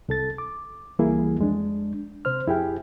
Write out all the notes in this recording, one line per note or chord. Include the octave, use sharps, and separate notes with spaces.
C2 A4 A6
D6
C#2 E3 G3 A#3 E4 G#4
F2 G#3 D4
C3 C5 F6
F2 E4 G4 G#4 G5